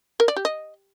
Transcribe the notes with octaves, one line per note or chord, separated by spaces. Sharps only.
A#4
D5
G4
D#5